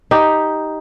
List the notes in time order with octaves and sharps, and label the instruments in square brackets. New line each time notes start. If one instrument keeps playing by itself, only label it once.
[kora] D#4 G4